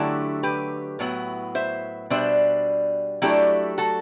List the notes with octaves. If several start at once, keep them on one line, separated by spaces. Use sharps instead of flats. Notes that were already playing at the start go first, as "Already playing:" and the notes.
Already playing: D3 F#3 A3 E4 G4
G4 B4
A2 F#3 B3 E4
C5 E5
B2 G3 D4 C5 E5
F#3 A3 D4 E4 G4
F#4 A4